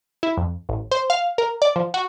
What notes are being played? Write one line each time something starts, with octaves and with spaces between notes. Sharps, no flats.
E4
F2
A1
C5
F5
A#4
D5
F3
F#4